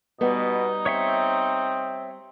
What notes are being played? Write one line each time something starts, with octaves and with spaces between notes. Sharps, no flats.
B2 G3 B3 D#4
C4 C#5 E5 C#6